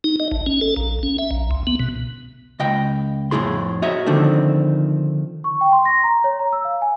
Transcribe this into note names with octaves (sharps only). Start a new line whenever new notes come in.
D#4
D#5
A1
C#4
A4
A#1
C#4
E5
A#1
C2
B3
B2
C#2 D#5 G5
F2 A2 F3 E4 G#4 C6
F#4 C#5 D#5 E5
D3 D#3 F3 A3 C4
C#6
G5
C6
A#6
A#5
C#5
A#5
E6
F5
G#5